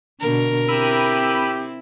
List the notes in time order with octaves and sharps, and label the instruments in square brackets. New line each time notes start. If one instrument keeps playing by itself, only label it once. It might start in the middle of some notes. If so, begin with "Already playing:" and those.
[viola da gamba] B2 D3 [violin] A#4
[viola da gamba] C4 E4 [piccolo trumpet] G4 [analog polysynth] B5 E6 D#7